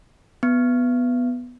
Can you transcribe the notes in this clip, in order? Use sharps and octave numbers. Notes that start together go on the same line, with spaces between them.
B3